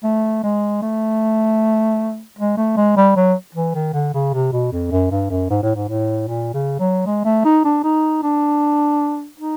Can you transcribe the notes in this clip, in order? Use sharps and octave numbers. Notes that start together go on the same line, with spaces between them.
A3
G#3
A3
G#3
A3
G#3
G3
F#3
E3
D#3
D3
C#3
C3
B2
F2
F#2
G2
F#2
G#2
A2
G#2
A2
A#2
C#3
F#3
G#3
A3
D#4
D4
D#4
D4
D#4